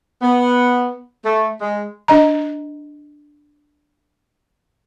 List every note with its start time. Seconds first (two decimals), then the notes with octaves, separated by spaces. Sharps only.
0.22 B3
1.25 A3
1.61 G#3
2.08 D4 D#5 A#5